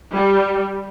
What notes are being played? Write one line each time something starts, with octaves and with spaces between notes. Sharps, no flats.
G3